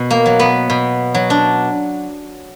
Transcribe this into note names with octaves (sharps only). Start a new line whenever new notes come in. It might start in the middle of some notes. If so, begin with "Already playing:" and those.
Already playing: B2
A#3
F#3
B3
B2
F#3
D4